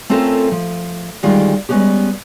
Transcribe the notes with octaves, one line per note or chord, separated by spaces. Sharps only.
A3 C4 C#4 F4 A4 A#4
F3
D2 D#3 G3 G#3 F4
G3 G#3 A#3 B3 C#4 G4